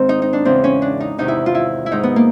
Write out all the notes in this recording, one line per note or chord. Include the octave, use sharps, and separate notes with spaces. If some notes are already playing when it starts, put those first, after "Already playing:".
Already playing: G#2 D#3 C4
D#4
D#4
D4
E2 C#3 E3 C4
C#4
D4
D#4
E2 C3 D#3 D#4
E4
F4
E4
E4
G#2 D#3 D#4
B3
A#3